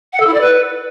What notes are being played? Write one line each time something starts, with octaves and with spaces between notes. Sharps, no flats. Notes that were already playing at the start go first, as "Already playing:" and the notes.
F#5
A4
E4
D5
B4